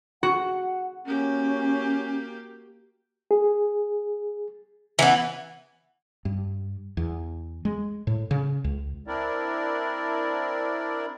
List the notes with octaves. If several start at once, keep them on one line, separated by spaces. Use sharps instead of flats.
F#4 F#5
A#3 C#4 G4
G#4
E3 B3
G2
E2
G#3
A2
C#3
C#2
C4 D4 E4 A#4 D5